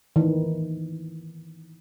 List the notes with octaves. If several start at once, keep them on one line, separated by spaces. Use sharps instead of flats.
D#3 E3